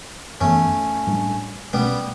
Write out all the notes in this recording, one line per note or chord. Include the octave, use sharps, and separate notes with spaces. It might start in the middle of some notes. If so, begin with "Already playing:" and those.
F#2 E3 A3 B3 C#4
A2 G3 D4
B2 G3 A3 B3 C#4